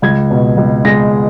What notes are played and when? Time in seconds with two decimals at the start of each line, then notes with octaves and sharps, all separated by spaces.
0.02 C#2 G#6
0.30 B2
0.57 C#2
0.85 G#3 A#6